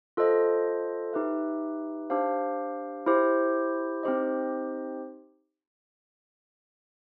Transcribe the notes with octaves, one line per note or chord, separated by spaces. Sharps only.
F4 A4 C5 D#5
D#4 G4 B4 E5
D4 G4 C5 F5
E4 G4 C5
C4 D#4 G4 C5 D#5